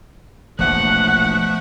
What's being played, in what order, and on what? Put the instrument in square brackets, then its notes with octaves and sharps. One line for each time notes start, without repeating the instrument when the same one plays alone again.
[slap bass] E1 A#1 A2 [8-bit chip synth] F3 A3 [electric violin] F#5 [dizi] F#6